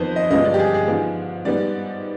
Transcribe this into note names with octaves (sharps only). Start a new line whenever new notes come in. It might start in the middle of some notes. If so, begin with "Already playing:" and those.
Already playing: F2 D#3 B3 B4 C5
D#5
G2 D3 F3 G#3 B3 D#5
D5
G4
G#4
G#4
G#2 F3 B3
G#2 G3 B3 D5